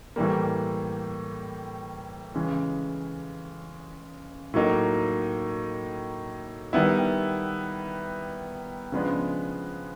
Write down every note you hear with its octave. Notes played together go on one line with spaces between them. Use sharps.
A2 E3 G3 A#3
C#3 E3 G#3
A2 F#3 A#3 D#4
D#3 G3 B3 E4
C#3 F3 G#3 B3 D4